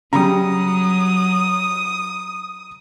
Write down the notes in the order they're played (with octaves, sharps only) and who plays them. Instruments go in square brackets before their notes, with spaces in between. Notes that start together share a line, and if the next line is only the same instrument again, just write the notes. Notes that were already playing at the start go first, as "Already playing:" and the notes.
[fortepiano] C#3 G3 [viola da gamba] F#3 [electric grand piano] A#5 [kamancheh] D#6